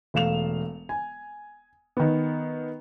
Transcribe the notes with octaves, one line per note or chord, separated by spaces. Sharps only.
E1 A3 F5 E7 F7
G#5
D#3 B3